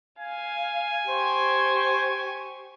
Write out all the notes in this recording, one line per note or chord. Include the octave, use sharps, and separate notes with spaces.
F5 G#5
G4 C5 C#6